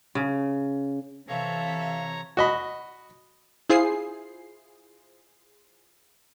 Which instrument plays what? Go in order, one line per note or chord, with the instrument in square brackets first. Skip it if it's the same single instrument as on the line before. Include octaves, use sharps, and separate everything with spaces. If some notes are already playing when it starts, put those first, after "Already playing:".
[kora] C#3
[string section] C3 E3 [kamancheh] A4 E5 [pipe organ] C#5 A#5 [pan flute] F5
[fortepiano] F#4 D#5 B5
[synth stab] E4 F4 G#4 C5 C7